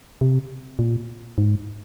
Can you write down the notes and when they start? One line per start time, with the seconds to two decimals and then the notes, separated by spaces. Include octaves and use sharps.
0.21 C3
0.79 A#2
1.38 G#2